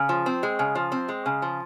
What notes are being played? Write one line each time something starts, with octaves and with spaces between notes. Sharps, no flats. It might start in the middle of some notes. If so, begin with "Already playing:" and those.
Already playing: C#3
F3
C4
G#3
C#3
F3
C4
G#3
C#3
F3